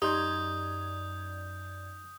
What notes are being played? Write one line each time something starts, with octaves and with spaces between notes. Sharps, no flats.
F#2 D#4 G4 D5 C6 D#6 G6 G#6